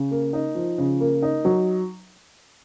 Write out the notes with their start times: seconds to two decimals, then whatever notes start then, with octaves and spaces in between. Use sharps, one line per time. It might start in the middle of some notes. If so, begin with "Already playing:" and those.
Already playing: C#3
0.11 A#3
0.33 D#4
0.55 F3
0.78 C#3
1.00 A#3
1.22 D#4
1.45 F#3